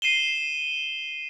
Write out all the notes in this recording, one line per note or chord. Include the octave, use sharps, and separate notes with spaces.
C7 D#7 E7 G7